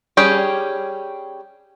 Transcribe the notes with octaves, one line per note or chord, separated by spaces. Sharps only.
G3 C#4 G4 G#4 G5